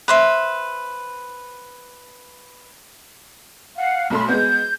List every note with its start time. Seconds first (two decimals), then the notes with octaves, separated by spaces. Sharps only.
0.08 B4 C5 E5
3.77 F5 F#5
4.10 B1 A3 B5 C6
4.29 G#3 B3 G6